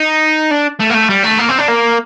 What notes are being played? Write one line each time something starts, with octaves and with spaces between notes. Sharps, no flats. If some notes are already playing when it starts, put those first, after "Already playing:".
Already playing: D#4
D4
A3
A#3
A3
G3
A3
A#3
C4
D4
A#3